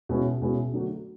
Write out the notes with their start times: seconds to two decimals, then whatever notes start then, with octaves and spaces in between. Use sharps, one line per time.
0.09 B2 G#3 C#4 E4
0.42 B2 G#3 C#4 E4
0.73 D3 F#3 A3 D4 F#4